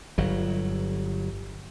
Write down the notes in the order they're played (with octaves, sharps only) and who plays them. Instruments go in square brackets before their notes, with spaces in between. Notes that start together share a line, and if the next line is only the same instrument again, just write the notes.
[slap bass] G1 F#3